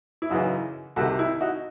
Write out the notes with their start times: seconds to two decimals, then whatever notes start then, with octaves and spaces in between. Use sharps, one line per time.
0.22 E4
0.30 F#2 C#3 E3 D#4 F#4
0.96 C2 C3 D#3 F#4 A4
1.19 E4
1.41 D#4 F#4